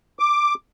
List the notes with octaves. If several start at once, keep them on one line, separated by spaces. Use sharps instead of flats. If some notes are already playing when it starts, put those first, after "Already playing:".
D6